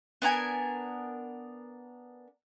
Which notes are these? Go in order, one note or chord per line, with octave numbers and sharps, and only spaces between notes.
B3 D4 A#4 G#5